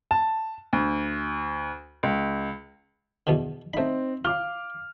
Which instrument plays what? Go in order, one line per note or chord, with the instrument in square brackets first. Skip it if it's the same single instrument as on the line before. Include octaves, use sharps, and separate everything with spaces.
[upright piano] A5
D2
C#2
[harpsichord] E2 B2 D3
[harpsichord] A3 B5 [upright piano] C4 D#4
[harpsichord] F4 [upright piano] F5 D6 F6